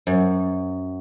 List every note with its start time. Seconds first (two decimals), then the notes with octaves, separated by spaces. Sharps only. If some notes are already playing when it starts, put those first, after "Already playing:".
0.07 F#2